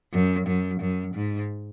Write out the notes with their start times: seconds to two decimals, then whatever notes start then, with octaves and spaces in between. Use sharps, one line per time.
0.13 F#2
0.47 F#2
0.80 F#2
1.15 G#2